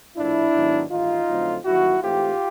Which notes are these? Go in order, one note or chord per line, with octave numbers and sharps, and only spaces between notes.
A#1 A2 F3 D4 E4
G#2 D#3 F#3 B3
A1 G2 D#3 D#4 F4
F2 D3 F#3 A3 C4
A1 G2 D#3 F#3 A#3 E4 F#4
G#2 E3 A3 C4 F4 G4